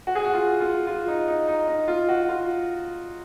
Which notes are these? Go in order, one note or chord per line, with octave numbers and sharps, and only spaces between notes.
F#4
G#4
F#4
F4
F4
F4
D#4
D#4
D#4
D#4
F4
F#4
F4